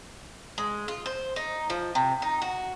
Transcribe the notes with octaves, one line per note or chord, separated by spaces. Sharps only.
G#3
F4
C5
D#4
F3
C3
D#4
F#4